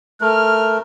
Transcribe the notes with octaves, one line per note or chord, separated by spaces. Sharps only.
A3 A#4 F6